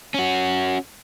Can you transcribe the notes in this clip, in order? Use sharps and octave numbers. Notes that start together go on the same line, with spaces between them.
C#4 F#4